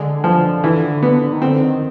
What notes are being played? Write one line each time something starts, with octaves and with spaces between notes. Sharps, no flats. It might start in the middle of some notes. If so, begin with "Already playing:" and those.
Already playing: D3 G#3
F3
E3
B3
D#3
D3 C4
D#3